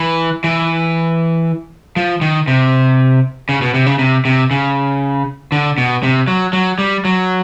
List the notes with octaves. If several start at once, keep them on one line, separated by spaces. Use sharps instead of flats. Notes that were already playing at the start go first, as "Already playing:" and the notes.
Already playing: E3
E3
F3
D#3
C3
C#3
B2
C3
C#3
C3
C3
C#3
D3
B2
C3
F#3
F#3
G3
F#3